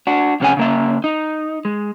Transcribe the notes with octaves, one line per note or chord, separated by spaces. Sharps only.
D4 F#4
F2 C3 C#4 G#4 F#5 G#5
C#3 A#3 E5
D#4
G#3